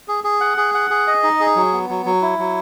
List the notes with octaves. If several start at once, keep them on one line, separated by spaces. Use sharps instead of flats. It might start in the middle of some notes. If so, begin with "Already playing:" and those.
G#4
G#4
F#5
G#4
F#5
G#4
D#5
D#4
G#4
F#3
B3
F#3
F#3
E4
F#3